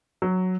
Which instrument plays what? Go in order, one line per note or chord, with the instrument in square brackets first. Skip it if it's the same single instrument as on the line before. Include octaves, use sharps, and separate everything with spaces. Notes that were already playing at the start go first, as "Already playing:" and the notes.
[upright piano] F#3